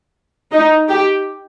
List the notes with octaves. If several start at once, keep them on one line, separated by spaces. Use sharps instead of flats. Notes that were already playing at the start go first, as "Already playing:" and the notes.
D#4
G4